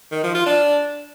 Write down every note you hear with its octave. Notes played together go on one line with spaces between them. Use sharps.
D#3
F3
F4
D4